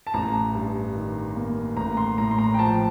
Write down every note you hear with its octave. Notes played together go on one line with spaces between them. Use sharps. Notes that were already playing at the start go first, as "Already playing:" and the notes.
A5
A1 A#5
G2
D#3
A#3
A1 A#5
C6
A2 A#5
C6
A#5
G5
F3 A5